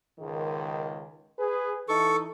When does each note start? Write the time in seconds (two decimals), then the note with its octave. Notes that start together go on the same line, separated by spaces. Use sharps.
0.19 C#2 G#2 D#3
1.39 G#4 B4
1.89 E3 D#4 A4 C#6